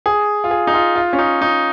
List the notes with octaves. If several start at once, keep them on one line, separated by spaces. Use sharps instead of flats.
G#4
F4
G#4
D#4
F4
F4
C#4
D#4
D#4